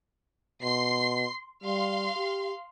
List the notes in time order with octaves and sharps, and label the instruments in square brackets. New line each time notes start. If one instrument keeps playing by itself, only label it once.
[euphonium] B2 [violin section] C6 C7
[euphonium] G3 [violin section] F5 C6
[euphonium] G4